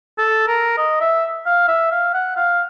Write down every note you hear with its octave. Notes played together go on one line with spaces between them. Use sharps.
A4
A#4
D#5
E5
F5
E5
F5
F#5
F5